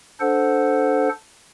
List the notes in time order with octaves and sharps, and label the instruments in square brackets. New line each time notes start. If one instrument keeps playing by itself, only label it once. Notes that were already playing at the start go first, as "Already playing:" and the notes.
[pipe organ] D4 A4 C5 F#5